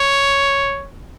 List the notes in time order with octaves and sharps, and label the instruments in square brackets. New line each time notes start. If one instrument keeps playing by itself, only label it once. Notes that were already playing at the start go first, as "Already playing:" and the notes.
Already playing: [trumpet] C#5